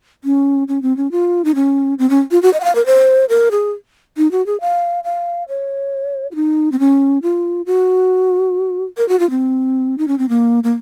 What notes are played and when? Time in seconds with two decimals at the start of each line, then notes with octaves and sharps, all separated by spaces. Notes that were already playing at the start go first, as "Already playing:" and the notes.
0.24 C#4
0.68 C#4
0.82 C4
0.97 C#4
1.11 F4
1.45 D#4
1.55 C#4
1.99 C4
2.10 C#4
2.31 F4
2.43 F#4
2.53 D#5
2.60 F#5
2.64 F5
2.75 A#4
2.86 C5
3.29 A#4
3.51 G#4
4.17 D#4
4.31 F#4
4.46 G#4
4.61 F5
5.04 F5
5.48 C#5
6.31 F4
6.35 D#4
6.72 C4
6.79 C#4
7.23 F4
7.66 F#4
8.97 A#4
9.09 F#4
9.19 F4
9.30 C4
9.98 D#4
10.08 C#4
10.18 C4
10.29 A#3
10.64 A#3